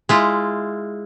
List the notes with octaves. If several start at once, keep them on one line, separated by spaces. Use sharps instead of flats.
G#3 E4 F4